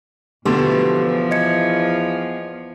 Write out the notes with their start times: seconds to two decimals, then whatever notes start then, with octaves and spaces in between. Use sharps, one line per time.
0.45 E2 B2 D3 F3 A3 B3 G4 C6
1.31 D#5 G#6 C#7